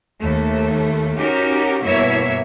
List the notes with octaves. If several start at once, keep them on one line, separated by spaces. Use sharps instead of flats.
D#2 A3
C#4 D#4 F#4 G4 A#4
G2 B2 A#3 E4 C#5 E5